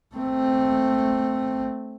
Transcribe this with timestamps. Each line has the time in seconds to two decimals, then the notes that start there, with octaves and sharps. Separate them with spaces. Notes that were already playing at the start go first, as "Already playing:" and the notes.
0.16 A3 C4